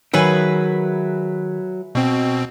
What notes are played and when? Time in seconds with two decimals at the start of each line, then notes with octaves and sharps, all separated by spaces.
0.14 D#3 F#3 G#4 B4 E5
1.95 B2 C4